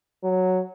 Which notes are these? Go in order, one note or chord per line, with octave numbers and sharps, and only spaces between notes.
F#3